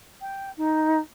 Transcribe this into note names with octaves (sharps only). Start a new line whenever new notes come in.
G5
D#4